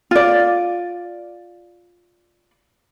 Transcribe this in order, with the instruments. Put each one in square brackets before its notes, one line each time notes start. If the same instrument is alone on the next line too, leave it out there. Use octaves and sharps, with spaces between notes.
[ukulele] F4 D5